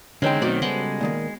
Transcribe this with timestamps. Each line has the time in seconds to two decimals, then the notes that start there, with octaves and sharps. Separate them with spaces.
0.22 E2 D3 G#3 C4 C#4 D#4 B4 G5
0.42 B1 D#3 A3 C4 D#4 F#4 C5 D5
0.62 C#3 G3 G#3 B3 A4 F#5 G5
1.01 A#2 D#3 A#3